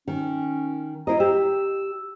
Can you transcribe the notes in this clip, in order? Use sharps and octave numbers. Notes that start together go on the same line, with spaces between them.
D#3 C#4
E4 C5 D#5 A#5
G4 E6